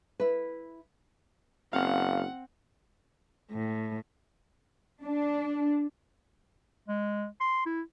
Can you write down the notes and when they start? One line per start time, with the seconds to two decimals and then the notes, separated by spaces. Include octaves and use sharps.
0.20 E4 B4
1.73 F#1 C4 F5 F#5
3.51 A2
5.03 D4
6.88 G#3
7.40 C6
7.66 E4